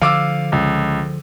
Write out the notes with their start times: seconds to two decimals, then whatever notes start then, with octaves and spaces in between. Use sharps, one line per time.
0.01 D3 F3 F5 D6 E6
0.52 C#2